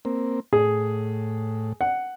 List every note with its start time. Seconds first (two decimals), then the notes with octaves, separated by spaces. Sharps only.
0.05 A#3 C4
0.53 A2 G#4
1.81 F#5